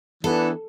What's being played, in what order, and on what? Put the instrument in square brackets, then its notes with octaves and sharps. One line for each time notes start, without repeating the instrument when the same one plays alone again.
[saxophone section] E3 B3 D4 [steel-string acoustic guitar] A4